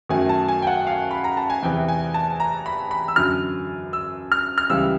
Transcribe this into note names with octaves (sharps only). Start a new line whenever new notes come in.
F#2 D#3 F#3 A3 G#5
A5
G#5
G5
F#5
F5
B5
A#5
A5
G#5
E2 C3 E3 G5
G#5
A5
A#5
B5
B5
E6
F#2 D3 F#3 F6
E6
F6
F6
C#2 C#3 E3 G3 E6